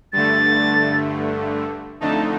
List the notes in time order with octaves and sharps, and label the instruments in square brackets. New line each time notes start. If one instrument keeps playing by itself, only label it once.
[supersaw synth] G2 D3 A3 [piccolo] A6
[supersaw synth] F2 D3 A3 D#4 [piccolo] A5